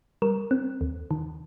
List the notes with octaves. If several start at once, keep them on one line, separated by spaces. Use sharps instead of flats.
G3 A#4
C4
D#2
D#3